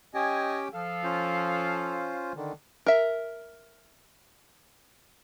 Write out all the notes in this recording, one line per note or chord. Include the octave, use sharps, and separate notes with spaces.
C#4 G4 D#5 G5 G#5
F3 A4 F5
C#4 F4 C5
D3 D#3
A#4 E5